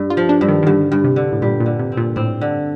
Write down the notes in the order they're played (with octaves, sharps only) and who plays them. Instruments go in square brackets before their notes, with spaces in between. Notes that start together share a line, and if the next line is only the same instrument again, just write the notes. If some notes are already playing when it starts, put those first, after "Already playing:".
Already playing: [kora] G2
[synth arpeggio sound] F4
[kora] F3
[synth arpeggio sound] D4
[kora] G2
[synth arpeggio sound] D#3
D#3
[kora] G2 [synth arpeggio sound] D3
[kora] G2
[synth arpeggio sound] C3
[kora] D3
[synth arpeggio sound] A2
[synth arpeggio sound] A#2 [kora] G3
[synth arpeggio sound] A#2
[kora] D3
[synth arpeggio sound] C3
[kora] C4
[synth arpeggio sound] A#2
[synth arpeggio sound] A2 [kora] C4
[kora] D3